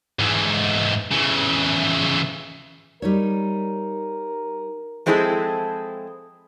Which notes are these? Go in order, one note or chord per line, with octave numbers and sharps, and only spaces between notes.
G#2 E3
C#3 E3
G3 D#4 A#4 C#5
F3 G#3 C4 E4 G#4 A4